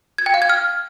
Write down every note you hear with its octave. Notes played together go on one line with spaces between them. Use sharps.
G#6
G5
F5
G#6
F6